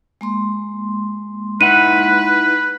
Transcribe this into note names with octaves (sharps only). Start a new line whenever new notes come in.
G#3 A#3 C6
D#4 E4 B4 F#5 D#7